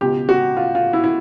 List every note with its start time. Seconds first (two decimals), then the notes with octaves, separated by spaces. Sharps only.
0.01 C#2 B2 G4
0.29 F#4
0.57 F4
0.75 F4
0.93 E4
1.04 E4